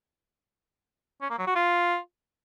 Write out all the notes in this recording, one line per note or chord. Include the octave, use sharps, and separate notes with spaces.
C#4
A#3
F#3
F#4
F4